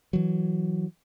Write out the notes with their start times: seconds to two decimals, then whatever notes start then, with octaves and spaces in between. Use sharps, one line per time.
0.13 E3 F#3